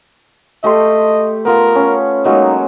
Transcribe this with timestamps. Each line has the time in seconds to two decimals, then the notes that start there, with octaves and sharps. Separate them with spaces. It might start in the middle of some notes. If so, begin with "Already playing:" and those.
0.64 A3 G4 D#5 C6
1.45 B3 F4 A#4
1.75 C#4
2.25 F#3 G#3 A#3 D#4